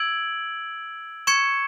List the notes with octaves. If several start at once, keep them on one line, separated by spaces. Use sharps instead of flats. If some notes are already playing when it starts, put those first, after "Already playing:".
Already playing: E6 G#6 D7 F#7
C#6 G#6 C#7 E7